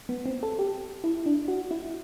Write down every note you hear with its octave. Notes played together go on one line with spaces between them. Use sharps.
B3
C4
A4
G4
E4
D4
F#4
E4